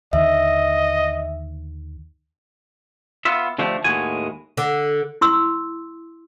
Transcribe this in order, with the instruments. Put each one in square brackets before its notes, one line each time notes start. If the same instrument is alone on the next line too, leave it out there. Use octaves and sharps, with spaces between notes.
[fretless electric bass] D#2 D3 D#3 [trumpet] D#5 [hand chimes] E5
[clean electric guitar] B3 F4 E5
D3 F3 A3 D4 G4
D#2 A2 G#3 F#4 G#5
[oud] D3
[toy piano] E4 C6 E6